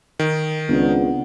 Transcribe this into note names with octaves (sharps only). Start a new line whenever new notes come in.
D#3
C#2 B3 C4 D4